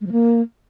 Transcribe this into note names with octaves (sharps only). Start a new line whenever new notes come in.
G#3
F3
A#3